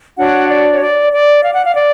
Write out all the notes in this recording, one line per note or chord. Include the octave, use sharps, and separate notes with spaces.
D4 F#4 C#5 F#5
D5
C#5
D5
D5
F5
F#5
F5
D5